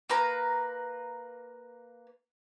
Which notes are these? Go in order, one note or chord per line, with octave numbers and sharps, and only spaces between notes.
A#3 B4 A#5